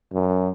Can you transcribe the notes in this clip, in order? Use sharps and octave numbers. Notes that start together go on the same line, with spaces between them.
F#2